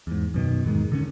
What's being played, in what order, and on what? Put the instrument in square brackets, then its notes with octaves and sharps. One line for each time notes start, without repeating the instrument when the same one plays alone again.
[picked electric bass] E2 G#2
F#2 B2 D#3
E2 G#2 D#3 G#3
D3 D#3 C#4